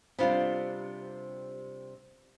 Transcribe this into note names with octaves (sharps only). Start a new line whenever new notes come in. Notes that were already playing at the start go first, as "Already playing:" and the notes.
C3 G3 B3 D4 F4